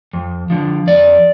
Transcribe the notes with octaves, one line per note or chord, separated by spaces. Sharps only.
F2
D3 F3
F2 D5